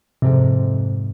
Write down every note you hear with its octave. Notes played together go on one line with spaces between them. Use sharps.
F2 G#2 C3